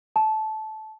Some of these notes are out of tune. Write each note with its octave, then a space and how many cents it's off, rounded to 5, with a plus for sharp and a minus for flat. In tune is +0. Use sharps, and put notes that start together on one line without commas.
A5 -15